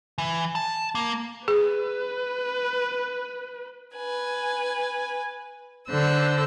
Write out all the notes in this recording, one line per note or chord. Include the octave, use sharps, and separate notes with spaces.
E3
A5
A#3
G#4 B4
B4 G#5
D3 C5 E6 F#6